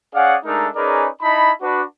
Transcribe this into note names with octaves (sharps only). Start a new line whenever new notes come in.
C#4 G#4 D5 F5 F#5
G#3 A3 D4 D#4 A4 A#4
C#4 D#4 G#4 A#4 B4 D5
D#4 E4 A5 B5
D4 F#4 B4